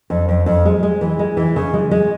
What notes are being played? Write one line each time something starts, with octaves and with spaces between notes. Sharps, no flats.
F2
F2
F2
G#3
G#3
E3
G#3
E3
C#3
G#3
G#3